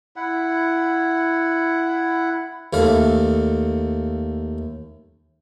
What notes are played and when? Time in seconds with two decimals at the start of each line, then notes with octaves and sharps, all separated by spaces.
0.16 E4 F#5
2.73 D#2 A3 F5